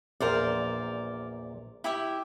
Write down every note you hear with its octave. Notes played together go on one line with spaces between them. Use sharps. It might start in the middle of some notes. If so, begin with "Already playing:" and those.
A#1 E2 A#2 A#4 C5 D5
E4 G4 E5